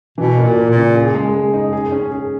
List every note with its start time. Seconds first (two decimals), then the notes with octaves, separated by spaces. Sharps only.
0.18 B2 E3
0.37 A#3
0.43 A#2
0.57 A#3
0.70 A#2
0.76 C#3
0.95 G#4
1.15 G#3
1.34 G#3
1.54 D#4
1.73 G#4
1.92 C#4
2.12 G#4